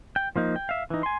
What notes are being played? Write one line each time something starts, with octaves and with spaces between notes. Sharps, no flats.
G5
F3 A#3 D#4
G5
E5 F5
E3 D#4
G#5 C6